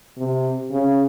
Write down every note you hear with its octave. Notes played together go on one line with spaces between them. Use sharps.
C3
C#3